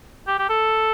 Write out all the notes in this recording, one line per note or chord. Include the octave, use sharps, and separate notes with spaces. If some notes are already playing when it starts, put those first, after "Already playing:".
G4
G4
A4